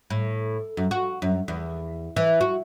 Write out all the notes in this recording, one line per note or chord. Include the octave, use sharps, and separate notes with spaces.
A2
F#2
F#4
F#2
E2
E3
F#4